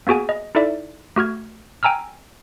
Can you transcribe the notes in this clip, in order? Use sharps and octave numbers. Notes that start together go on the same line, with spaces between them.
A#3 B3 F#4 G#4 G#5
D#5
D#4 E4 A4 D5 E5
A3 F#4 F6 G#6
G5 G#5 A#5 E6 F6